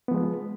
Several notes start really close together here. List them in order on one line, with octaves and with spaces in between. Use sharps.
B3 F3 G#3